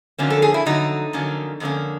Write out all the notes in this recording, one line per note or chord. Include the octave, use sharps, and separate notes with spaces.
F2 D3 F#3 A#3 C#4
A4
G#4
E4
F2 D3 F#3 D#4
F2 D3 F#3 A#3 C#4
F2 D3 F#3 A#3 C#4